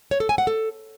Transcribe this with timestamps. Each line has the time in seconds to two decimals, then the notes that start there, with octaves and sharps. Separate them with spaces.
0.11 C#5
0.20 A4
0.29 G#5
0.38 F#5
0.47 A4